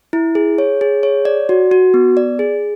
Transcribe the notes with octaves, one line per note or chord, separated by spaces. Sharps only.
E4
G#4
C#5
G#4
C#5
D5
F#4
F#4
B3
D5
G#4